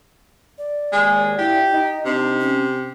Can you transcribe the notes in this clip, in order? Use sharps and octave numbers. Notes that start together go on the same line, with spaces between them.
D5
D#2 G#3
D4 E4 F4 G4
D#4 D#5
C3 D4
C#4